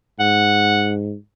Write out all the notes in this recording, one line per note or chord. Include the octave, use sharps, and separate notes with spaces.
G#2 F#5